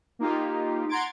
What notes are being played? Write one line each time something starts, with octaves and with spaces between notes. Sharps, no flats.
A#3 D#4 F4 G4
F#5 A#5 C6 G#6 A6 D7